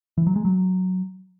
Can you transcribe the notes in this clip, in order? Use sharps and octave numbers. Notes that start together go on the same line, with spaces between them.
E3
F#3
G#3
F#3